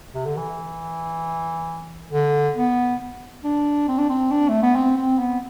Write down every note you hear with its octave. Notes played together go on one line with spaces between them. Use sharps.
C3
D3
E3
D3
B3
D4
C4
D4
C4
D4
A3
B3
C4
C4
B3